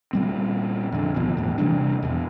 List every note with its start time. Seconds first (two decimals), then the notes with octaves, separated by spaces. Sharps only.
0.13 A#2 G3 C4
0.92 F2 D3
1.15 G#1 D#2 B2 F3
1.37 E2 A2
1.58 C3 E3 G3 D4
2.03 E2 B2